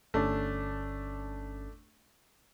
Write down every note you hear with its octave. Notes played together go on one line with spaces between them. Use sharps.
G1 A3 C#4 D4